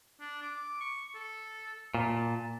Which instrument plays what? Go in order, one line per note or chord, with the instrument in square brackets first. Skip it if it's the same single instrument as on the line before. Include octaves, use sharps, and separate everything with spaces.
[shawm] D4
D6
C#6
A4
[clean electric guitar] A#2 [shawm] A5